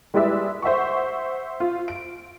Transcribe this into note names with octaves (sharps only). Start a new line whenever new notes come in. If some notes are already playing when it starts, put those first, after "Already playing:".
G3 G#3 E4 B4 D5 E5
C5 E5 F#5 C#6
F4
D7